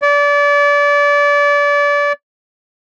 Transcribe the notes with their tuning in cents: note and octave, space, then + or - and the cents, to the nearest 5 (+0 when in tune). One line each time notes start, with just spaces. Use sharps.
D5 -30